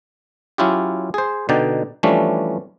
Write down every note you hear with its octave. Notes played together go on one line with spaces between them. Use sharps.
F#3 C#4 E4 F4 G4
G#4 C5
B2 D3 D#4 D5 G5
E3 F3 G3 A3 C#4 D4